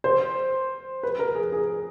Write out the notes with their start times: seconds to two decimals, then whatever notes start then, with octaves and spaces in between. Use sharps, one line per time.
0.04 C5
1.03 B4
1.19 A#4
1.35 G#4
1.52 G#4